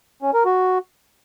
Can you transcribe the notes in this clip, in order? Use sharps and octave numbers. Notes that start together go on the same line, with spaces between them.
C#4
A#4
F#4